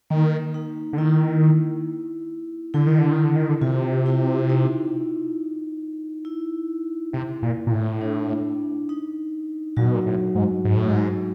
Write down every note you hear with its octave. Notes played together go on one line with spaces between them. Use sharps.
D#3 A#3
D#4
D3
D#3 E4
D3 E4
D#3
D3
D#3
D3
D#3
D3
C3 F4
E4
D#4
E4
C3
A#2
A#2
A2
D4
D#4
A#2 F#3 F#4
B2
A#2
A2
G#2
G#2
A2
G#2